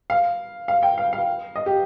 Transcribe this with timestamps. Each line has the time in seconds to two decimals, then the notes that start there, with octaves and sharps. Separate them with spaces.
0.10 F5
0.68 F5
0.83 G5
0.98 F5
1.13 F5
1.56 D#5
1.66 G4